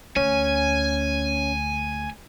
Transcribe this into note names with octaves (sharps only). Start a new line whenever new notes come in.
D2 C#4 G#5